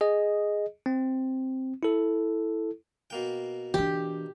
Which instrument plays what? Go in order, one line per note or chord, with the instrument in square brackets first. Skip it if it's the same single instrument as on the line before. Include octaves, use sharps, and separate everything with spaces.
[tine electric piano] G#4 D#5
C4
E4 A4
[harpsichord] B2 A#3 G5
[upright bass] E3 D4 [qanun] G4